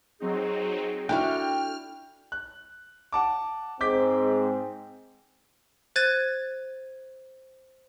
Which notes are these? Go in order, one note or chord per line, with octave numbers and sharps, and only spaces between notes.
F#3 C4 D#4 G#4
D4 E4 F#4 A4 G5 F6
F#6
F#5 A5 D6
G#2 C4 D6 G6 B6
C5 F#6 G#6 A6 D#7